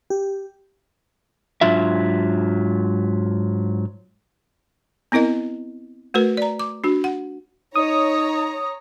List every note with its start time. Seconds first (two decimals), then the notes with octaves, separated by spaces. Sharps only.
0.10 G4
1.61 G#2 F#3 D4 F4 E5
5.12 B3 C4 E4 A#4 D#5
6.14 A3 F#4 A#4 B4
6.37 D5 A#5
6.60 D6
6.84 D4 F#4
7.04 F#5
7.76 D#4 C#5 A#5 D#6